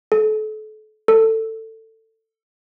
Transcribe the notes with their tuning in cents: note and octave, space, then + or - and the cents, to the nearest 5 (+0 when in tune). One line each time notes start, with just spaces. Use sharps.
A4 -35
A4 +20